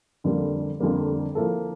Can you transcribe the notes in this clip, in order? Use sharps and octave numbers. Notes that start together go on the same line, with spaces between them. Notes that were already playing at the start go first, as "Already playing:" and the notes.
F2 D3 G3 A#3
F2 D3 G3 A#3
F3 A#3 E4 A4